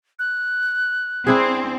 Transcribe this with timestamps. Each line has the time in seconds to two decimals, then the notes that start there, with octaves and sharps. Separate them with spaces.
0.19 F#6
1.27 C4 D4 E4 G#4